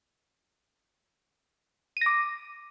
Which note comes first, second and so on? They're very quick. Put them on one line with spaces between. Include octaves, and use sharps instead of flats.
D#7 A#6 D6